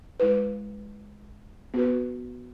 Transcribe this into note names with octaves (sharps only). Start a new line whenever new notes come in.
G#3 E4 B4
B3 F#4 B4